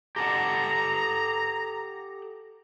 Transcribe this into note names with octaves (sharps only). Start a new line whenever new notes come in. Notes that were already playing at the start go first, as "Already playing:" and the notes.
G4 A4 F#5 A#5